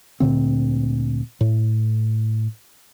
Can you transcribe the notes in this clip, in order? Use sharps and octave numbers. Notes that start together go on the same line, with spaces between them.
D2 A#2 D3 C4
A2